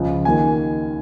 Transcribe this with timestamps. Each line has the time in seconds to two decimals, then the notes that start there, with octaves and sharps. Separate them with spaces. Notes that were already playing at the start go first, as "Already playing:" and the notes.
Already playing: C#2 C#3 F3
0.25 D#2 D#3 G#5